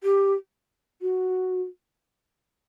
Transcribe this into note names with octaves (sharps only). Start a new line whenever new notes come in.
G4
F#4